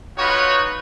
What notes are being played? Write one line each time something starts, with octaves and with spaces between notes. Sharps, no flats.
D#4 F4 F#4 B4 C#5